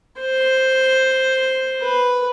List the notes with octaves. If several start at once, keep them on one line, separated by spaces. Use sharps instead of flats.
C5
B4